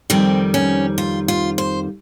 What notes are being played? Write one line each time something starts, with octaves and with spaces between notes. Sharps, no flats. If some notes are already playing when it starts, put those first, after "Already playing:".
F2 D#3 G3 C4
C#4
F4
F4
C5